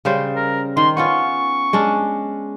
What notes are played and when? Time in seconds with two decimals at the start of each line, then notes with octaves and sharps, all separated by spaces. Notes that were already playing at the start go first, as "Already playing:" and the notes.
0.05 C#3 G3 C5
0.36 A#4
0.77 D#3 C6
0.97 B3 C#4 F4 C#6
1.73 G#3 C#4 D4